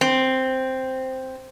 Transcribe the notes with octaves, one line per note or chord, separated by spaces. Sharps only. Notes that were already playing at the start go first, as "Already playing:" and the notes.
C4